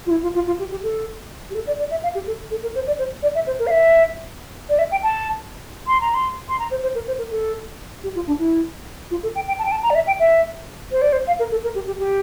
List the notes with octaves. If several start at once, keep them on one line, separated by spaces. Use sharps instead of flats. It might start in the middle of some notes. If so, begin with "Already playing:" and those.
F4
E4
F4
F4
F4
G4
G4
A4
G4
A4
D5
D5
E5
F5
G4
A4
A4
A#4
C5
D5
C5
D5
E5
C5
A#4
F5
E5
D5
E5
G5
A5
C6
A#5
C6
C6
A#5
C5
C5
A#4
C5
A#4
A4
G4
F4
D4
E4
F4
A4
G5
G5
A5
G5
A5
A#5
D5
E5
G5
E5
C5
D5
C5
F5
A#4
A4
A#4
G4
G4
G4